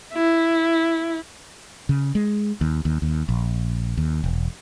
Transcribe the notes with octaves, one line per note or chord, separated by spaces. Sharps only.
E4
C#3
G#3
D#2
D#2
D#2
A#1
D#2
E1